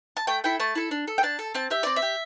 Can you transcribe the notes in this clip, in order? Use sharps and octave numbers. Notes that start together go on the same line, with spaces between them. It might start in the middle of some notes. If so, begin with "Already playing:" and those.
A5
A3 G5
E4 A4 G5
A3 A5
E4 A4
D4
A4
G5
D4 A5
A4
C4 A5
G4 E5
C4 D5
E5
G4